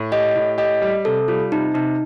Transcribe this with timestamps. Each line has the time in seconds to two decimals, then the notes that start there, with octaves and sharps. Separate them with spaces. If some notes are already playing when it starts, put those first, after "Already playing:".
Already playing: A2
0.12 G4 D#5
0.35 A2
0.58 G4 D#5
0.82 G3
1.05 C3 A4
1.28 G3 F4
1.52 C3 D#4
1.74 C3 D#4